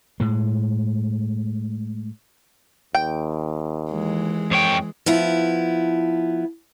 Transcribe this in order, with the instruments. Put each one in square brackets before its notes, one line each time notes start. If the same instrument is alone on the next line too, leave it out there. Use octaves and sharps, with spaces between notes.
[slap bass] A2 G#3
[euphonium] D#2 [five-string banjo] G5
[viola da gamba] E3 G#3
[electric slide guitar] F2 C#5 G5
[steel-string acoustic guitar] F3 B3 E4